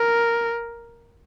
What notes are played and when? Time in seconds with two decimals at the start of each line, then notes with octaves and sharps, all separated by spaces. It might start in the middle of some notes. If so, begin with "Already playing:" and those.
Already playing: A#4